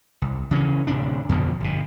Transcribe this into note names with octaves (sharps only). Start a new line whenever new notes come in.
C2
C#3 E3 G#3 C#4
D1 C3 D4
F2 B2 D3 F3
G1 B2